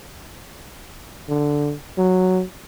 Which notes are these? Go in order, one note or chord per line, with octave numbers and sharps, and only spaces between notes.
D3
F#3